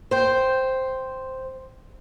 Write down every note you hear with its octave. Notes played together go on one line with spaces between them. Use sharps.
C5 G5